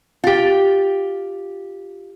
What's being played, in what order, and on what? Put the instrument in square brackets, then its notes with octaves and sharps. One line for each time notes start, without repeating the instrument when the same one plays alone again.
[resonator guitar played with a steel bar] F4 G4